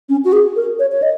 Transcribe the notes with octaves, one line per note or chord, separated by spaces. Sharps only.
C#4
F#4
G#4
A#4
C#5
C#5
D#5